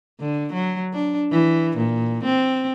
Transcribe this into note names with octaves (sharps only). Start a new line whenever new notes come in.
D3
F#3
D4
E3
A#2
C4